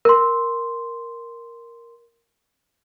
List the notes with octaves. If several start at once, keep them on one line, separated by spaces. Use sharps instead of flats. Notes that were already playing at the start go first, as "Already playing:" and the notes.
A#4 C6